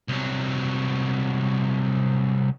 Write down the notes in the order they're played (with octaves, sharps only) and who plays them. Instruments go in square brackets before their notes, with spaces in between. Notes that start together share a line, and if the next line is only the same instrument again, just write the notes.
[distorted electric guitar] C2 F#3